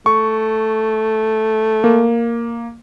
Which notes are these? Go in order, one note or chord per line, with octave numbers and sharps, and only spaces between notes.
A3 C#6
A#3